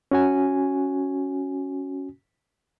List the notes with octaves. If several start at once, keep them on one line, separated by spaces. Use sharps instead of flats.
C#4 F#4 G#5